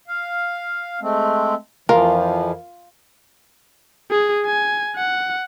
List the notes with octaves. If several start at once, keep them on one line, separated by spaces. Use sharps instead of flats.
F5
G#3 A3 C4
F2 E3 F3 F4 A#4
G#4
G#5
F#5